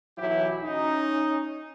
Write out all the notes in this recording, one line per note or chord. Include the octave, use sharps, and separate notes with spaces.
B1 E3 F#3 E4 G4
C#4 D#4